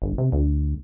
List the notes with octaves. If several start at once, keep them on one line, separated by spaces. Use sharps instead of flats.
G1
C3
D2